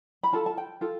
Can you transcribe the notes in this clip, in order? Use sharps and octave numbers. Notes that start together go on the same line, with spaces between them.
B5
F4 A4 A5
A5
G5
F4 A4